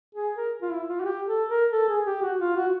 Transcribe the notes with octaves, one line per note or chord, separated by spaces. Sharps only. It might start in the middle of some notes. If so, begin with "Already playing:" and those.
G#4
A#4
F4
E4
F4
F#4
G4
A4
A#4
A4
G#4
G4
F#4
F4
F#4